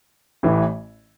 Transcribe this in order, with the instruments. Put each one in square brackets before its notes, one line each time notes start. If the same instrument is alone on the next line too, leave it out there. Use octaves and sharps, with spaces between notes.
[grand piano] A1 A2 E3